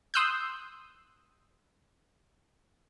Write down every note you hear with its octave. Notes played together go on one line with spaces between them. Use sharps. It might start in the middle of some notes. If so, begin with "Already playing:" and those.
C6 D#6 E6 F#6 G6